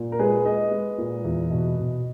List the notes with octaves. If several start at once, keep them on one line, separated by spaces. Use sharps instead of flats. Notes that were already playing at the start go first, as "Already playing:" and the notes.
Already playing: A#2
A#4
G#3 G#4 B4
G#3 B4 D#5
G#3
A#2
E2
B2
B2